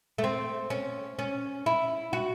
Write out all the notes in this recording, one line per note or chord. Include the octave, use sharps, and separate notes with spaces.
A3
C4
C#4
C#4
E4
F#4